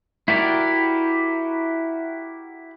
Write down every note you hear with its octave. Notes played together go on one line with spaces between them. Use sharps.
E4 F#4 G4 A#4 D5